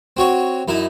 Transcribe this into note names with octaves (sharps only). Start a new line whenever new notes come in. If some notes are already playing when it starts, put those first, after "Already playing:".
C4 F#4 C#5
F#2 D#4 E4